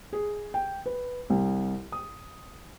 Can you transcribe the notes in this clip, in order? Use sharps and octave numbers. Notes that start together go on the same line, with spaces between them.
G#4
G5
B4
C2
D#6